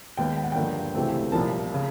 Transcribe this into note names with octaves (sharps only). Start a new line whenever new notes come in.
D#2 D#3 G#3 B3 G5
G5
F#5
G2 D3 F3 A#3 G5
C#2 C3 E3 A3 C4
C2 A#2 F3 A#3 A5
C#3